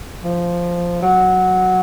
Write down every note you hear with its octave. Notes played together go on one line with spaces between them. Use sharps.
F3
F#3